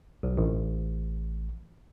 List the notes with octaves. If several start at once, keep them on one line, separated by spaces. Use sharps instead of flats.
B1
A1